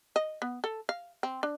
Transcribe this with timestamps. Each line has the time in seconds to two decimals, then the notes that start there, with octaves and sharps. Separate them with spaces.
0.16 D#5
0.42 B3
0.64 A4
0.89 F5
1.23 C4
1.43 D4